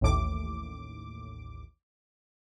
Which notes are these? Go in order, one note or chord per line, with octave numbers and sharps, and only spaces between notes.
A1 D#2 A2 D6